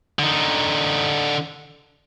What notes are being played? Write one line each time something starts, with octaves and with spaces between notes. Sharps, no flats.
D3 D#4